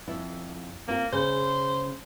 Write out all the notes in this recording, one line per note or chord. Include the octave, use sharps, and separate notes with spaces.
F2 E4
A#3 C4 F4
C#3 C5